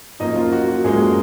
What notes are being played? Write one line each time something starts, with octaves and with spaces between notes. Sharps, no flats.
F#2 F3 A#3 D#4 D#5
F4
F#4
F#4
F#2 F3 G#3 A#3 G#4